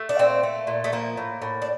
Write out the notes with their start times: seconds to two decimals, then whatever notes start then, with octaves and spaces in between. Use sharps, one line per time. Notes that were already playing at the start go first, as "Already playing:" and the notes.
Already playing: A3
0.09 D4
0.19 A#2 C4
0.43 A3
0.67 A#2
0.84 A3
0.92 F3 A#3
1.17 A2
1.42 A2
1.62 D4